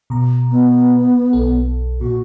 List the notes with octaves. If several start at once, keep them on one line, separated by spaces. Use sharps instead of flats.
B2 A#5
B3
B1 A4
A#2 F#4